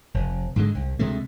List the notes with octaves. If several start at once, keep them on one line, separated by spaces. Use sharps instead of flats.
F1
G#2 D3 G#3
C2
D2 C3 G#3 A3